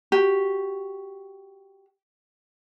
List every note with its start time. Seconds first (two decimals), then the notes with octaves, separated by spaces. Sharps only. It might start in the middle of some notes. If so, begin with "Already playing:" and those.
0.12 F#4 G4